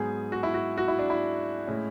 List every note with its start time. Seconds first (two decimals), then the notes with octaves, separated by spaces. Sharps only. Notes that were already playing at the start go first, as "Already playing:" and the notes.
Already playing: G#2 F#3 B3 G#4
0.32 F#4
0.43 E4
0.54 F#4
0.77 F#4
0.88 E4
0.99 D4
1.10 E4
1.67 A2 G#3 C#4